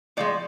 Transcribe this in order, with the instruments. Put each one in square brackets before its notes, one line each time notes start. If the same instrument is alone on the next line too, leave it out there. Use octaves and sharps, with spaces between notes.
[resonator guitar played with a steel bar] A2 F3 G#3 D5